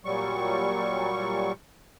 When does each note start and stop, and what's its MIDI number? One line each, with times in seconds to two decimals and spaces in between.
0.05 1.52 46
0.05 1.52 54
0.05 1.52 55
0.05 1.52 85